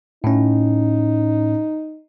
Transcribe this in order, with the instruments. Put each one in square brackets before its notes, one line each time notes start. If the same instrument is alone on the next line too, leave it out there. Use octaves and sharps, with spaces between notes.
[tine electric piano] A2 C#4 [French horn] D#4